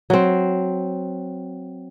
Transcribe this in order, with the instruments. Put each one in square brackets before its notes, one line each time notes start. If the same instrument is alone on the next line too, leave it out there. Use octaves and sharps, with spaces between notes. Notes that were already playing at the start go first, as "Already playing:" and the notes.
[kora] F#3 C4